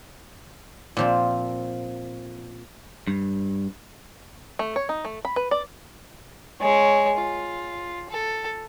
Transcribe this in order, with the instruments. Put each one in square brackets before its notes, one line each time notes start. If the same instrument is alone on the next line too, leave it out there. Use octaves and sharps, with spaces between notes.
[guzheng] A#2 F3 C4
[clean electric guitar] G2
[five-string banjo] A3
C#5
D#4
A3
B5
B4
D5
[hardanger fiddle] G#3 C#5
F4
A4